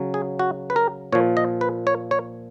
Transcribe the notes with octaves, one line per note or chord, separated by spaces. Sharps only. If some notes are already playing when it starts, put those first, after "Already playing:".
Already playing: C#3 F#3
G#4
F#4
B4
A#4
A#2 F3 C#5
D#5
B4
C#5
C#5